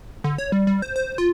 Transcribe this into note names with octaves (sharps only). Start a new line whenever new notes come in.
D3
C#5
G3
G3
C5
C5
F4